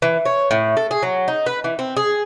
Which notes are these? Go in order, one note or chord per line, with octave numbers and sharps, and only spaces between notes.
E3
C#5
A2
A4
G#4
F#3
D#4
B4
E3
C4
G#4